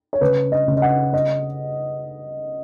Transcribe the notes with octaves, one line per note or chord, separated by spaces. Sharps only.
C#5
C#3 B4
D#5
C#3
D#5
F#5
D#5